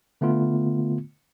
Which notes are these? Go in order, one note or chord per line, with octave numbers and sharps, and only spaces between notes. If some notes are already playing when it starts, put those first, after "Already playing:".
D3 A3 B3 F4